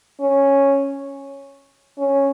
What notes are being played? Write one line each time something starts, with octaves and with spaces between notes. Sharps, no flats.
C#4
C#4